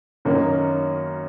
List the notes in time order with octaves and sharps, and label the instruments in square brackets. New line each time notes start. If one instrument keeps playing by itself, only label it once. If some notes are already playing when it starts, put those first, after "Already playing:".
[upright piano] F#2 D#3 F#3 A#3 C#4